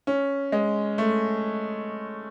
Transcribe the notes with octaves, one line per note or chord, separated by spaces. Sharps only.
C#4
G#3
A3